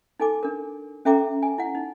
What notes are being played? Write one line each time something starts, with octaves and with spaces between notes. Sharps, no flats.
D#4 A4 G#5 D6
D4 A#4
C#4 A4 E5 G5 A#5 D6
G#5
E4 F#5
D#4